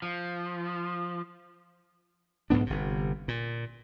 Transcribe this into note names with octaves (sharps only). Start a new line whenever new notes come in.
F3
B1 G#2 B3 D4
G1 C3
A#2